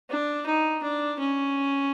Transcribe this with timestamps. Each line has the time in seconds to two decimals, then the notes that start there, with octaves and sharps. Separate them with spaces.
0.10 D4
0.46 D#4
0.83 D4
1.19 C#4